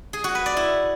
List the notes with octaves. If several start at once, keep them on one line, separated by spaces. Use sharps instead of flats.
G#4
F#4
B4
D5
E4